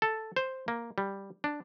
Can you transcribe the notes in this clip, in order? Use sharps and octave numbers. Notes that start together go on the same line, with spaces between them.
A4
C5
A#3
G3
D4